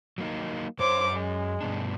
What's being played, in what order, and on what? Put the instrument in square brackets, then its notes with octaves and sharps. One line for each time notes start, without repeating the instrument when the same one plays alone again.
[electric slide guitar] F#3 A#3 D#4
[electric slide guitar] F#2 C#5 [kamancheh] C5 D6
[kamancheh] G#3
[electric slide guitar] G2 B2 D4